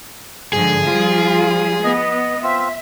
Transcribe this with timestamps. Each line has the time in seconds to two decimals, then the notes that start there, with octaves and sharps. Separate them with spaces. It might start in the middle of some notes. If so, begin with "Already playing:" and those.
0.53 G#2 D3 F3 G#4
0.84 F3 G3 F4
1.84 B3 D#5
2.43 C4 F4 E5